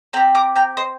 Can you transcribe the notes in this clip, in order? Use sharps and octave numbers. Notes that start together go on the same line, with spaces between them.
C4 G4 G5 A#5
A#5 D6
G5 A#5
C5 D#5